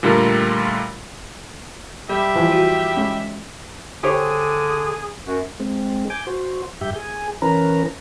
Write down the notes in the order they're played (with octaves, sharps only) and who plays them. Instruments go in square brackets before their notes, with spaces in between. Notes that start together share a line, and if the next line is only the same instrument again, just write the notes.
[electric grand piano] A#2 D3 G3 A3 F4 A#4
[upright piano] G3 [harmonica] G4 E5
[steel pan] E3 F3 F4
[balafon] F#4
[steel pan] G#3 C#4
[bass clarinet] D3 [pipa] G4 C5 C#5 [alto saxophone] G#4
[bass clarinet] F#2 [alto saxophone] F#4
[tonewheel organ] G#3 C4
G#5 D6 G6
F#4 C5
G2 G4 E5 G6
G#4 G#5
E3 C#4 A#4 B4 A#5